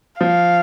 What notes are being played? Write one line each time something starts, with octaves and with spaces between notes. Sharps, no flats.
F3 F5